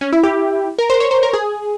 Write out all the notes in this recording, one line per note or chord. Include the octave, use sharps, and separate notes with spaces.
C#4
E4
G4
A#4
C5
C#5
C5
A#4
G#4